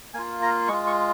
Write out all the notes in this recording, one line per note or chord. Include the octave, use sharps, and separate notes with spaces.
A#3 F4 G#5
A#5
G#3 F4 C#6
C#6